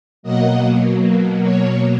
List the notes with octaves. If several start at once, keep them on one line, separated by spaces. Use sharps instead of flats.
B2 F#3 A#3 D#5 F#5
C#5